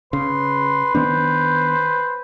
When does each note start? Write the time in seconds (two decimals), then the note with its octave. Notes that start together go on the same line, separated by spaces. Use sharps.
0.13 C#3 B4 C6
0.95 D#3 B3 D4 C5